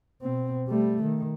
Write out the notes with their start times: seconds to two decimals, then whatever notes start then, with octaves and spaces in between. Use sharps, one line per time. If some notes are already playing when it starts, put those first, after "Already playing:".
0.22 B2 C4
0.68 G3 A3
1.03 D#3